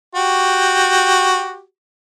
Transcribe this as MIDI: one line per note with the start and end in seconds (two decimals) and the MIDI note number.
0.15 1.62 66
0.15 1.62 67